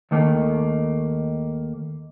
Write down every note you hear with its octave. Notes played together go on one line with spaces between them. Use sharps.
D#2 D#3 A3 A#3